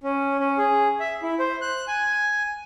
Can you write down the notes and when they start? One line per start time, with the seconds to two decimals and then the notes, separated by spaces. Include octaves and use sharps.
0.03 C#4
0.40 C#4
0.58 G#4
1.00 E5
1.23 E4
1.39 C5
1.61 F#6
1.88 G#5